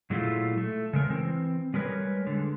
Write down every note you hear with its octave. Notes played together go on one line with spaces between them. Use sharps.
A#2 F#3 G#3 A3 E4 F4
A3
C#3 G#3 A#4
E3 C4
G3 G#3 A#4 B4 C#5
D3 G#3